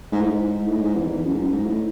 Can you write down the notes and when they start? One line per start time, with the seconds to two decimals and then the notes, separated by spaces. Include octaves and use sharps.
0.12 G#2
0.21 A2
0.29 G#2
0.67 A2
0.81 G#2
0.96 E2
1.10 E2
1.25 F#2
1.34 G#2
1.39 F#2
1.52 G#2
1.66 A2